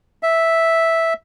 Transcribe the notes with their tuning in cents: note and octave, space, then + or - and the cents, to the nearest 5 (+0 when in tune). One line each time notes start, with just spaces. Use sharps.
E5 -5